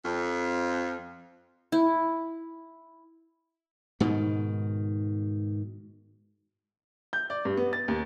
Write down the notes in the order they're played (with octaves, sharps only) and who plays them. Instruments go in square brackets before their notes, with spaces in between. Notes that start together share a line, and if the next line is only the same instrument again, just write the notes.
[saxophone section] F2
[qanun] E4
[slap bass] G#2 B2 D#3
[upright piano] G6
D5
G2
B3
A6
D#2